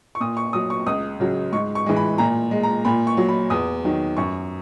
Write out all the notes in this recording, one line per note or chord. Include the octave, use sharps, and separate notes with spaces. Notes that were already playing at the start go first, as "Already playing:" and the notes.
C#6
A#2 D#6
C#6
F#3 D#6
C#6
C#2 D#6
C#3 F#3
G#2 C#6
C#6
E3 G#3
B5
A#2 A#5
G#3
A#5
A#2 B5
C#6
F#3
B5
E2 D#6
D#3 F#3
F#2 C#6